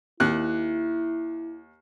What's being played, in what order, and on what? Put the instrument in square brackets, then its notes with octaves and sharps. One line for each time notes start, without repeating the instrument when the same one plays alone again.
[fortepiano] D#2 F#6 [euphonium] E4